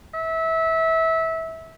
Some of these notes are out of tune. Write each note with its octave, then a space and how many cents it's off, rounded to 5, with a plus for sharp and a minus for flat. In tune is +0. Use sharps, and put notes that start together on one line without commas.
E5 -20